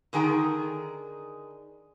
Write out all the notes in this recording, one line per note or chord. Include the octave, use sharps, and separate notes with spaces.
D3 D#3 G#4 G5 A#5